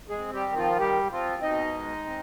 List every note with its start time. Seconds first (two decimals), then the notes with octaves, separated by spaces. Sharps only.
0.09 G#3 G#4
0.18 C4
0.33 G3 G4
0.48 D#3
0.56 F3 F4
0.79 G3 G4
1.11 F3 C4 F4
1.42 B2 D#4 D#5
1.74 G#3
2.06 C4